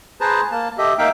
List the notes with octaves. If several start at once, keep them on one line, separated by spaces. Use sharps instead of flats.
G#4 B4 C5 A5 A#5
A#3 A5
G4 A4 D#5 E5
A#3 D#4 E5 F5 G5